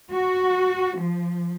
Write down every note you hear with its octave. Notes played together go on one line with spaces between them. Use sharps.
F#4
F3